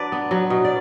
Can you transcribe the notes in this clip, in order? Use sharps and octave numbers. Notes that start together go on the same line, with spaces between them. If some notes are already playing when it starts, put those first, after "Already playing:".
Already playing: F#3 D4 B4 D5
B3
F#3
B2
D5